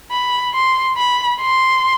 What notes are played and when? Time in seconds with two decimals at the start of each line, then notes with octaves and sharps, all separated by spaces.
0.11 B5
0.54 C6
0.96 B5
1.41 C6